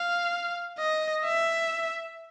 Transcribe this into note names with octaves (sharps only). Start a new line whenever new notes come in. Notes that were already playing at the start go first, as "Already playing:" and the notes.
Already playing: F5
D#5
E5